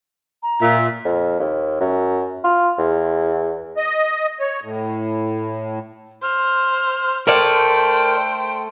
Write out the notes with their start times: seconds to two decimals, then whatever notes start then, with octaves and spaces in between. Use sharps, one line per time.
0.43 A#5
0.62 A#2 E5
1.05 F2
1.40 D#2
1.80 F#2
2.44 F4
2.78 E2
3.77 D#5
4.40 C#5
4.63 A2
6.23 C5 F6
7.27 A3 A#4 C5 D5 G5